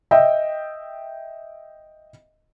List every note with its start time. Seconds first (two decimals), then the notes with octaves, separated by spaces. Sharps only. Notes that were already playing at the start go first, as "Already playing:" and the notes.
0.11 D#5 E5 G5